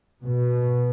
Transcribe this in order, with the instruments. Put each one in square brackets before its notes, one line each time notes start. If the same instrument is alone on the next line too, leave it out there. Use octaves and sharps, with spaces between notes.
[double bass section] B2